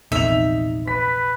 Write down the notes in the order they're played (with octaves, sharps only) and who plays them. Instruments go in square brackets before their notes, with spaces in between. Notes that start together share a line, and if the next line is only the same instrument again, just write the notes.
[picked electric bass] A#1 E2 C3 [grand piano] D#4 F7 [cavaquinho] E5
[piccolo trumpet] B4 [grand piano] B6